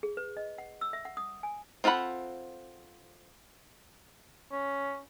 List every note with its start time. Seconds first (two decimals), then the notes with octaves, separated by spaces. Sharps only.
0.03 G#4
0.17 B4
0.37 D#5
0.58 F#5
0.81 E6
0.93 E5
1.05 F#5
1.17 D#6
1.43 G#5
1.84 C4 F4 A4 F#5 B5
4.51 C#4